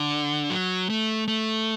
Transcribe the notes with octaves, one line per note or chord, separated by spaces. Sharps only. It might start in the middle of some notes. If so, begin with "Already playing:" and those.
Already playing: D3
F#3
A3
A3